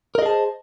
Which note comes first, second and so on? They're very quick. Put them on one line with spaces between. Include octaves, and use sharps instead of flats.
A#4 D#5 G#4 A5 C5